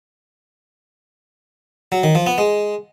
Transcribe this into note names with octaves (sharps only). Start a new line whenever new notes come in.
F#3
D#3
F3
B3
G#3